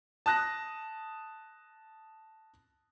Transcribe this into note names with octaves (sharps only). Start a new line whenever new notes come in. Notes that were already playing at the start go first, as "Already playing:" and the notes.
A5 D#6 F#6 A#6